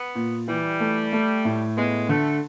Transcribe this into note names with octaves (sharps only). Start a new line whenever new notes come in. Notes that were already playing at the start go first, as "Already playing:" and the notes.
Already playing: B3
A#2
E3 G3
A3
A3
A2
G#3 B3
D3 A3